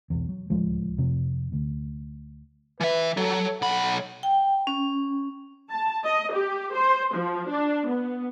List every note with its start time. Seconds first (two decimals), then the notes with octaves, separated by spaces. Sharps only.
0.10 B1 E2
0.29 F#3
0.50 D1 C#2 F3 G#3
0.98 F2 C3
1.52 D2
2.80 E3 B4 E5
3.17 F#3 A4
3.62 B1 F#5 B5
4.23 G5
4.67 C#4
5.70 A5
6.04 D#5
6.33 G4
6.75 C5
7.14 F3
7.50 D4
7.88 B3